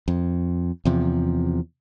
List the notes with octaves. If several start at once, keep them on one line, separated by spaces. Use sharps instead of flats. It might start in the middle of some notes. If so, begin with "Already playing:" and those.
F2
E2 C3 F3